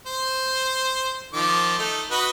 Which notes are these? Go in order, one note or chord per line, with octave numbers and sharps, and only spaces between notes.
C5
D#3 F3 D6
A3 D#4
F#4 B4 D#5